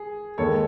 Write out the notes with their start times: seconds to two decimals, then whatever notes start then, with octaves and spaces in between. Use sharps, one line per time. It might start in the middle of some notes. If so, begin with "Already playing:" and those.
Already playing: G#4
0.38 D#2 D#3 G#3 A4 C#5